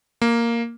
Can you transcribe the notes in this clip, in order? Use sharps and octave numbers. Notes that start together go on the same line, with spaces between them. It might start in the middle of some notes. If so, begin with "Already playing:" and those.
A#3